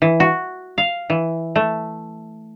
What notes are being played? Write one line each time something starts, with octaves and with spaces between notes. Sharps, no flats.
E3
F#4
F5
E3
A3